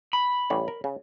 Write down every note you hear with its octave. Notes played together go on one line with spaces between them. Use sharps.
B5
A1 G3 C#5
A#4
C#3